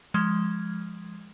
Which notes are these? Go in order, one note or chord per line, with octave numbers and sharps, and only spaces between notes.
F3 G#3